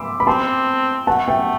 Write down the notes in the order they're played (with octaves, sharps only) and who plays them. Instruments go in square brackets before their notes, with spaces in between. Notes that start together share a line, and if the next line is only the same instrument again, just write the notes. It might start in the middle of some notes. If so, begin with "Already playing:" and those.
Already playing: [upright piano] B5 C6 D6 E6
B5
[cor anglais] C4 [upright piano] A5 C6
[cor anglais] A3 [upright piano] F#5 A5
[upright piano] E5 G5